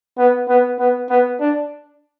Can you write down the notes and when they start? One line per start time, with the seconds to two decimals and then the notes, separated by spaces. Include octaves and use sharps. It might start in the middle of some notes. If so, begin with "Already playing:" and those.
0.18 B3
0.49 B3
0.79 B3
1.10 B3
1.40 D4